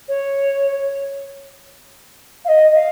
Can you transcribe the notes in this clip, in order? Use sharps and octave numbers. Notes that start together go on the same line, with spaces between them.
C#5
F5
D#5
F5